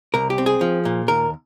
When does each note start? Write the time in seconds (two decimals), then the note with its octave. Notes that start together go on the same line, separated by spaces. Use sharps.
0.14 C2 A#4
0.30 G4
0.38 C4
0.46 G#4
0.61 F3
0.85 A#2
1.08 D#2 A#4